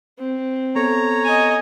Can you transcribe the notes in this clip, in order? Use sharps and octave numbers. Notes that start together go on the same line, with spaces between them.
C4
B3 A4 C#5 A#5
D#5 G#5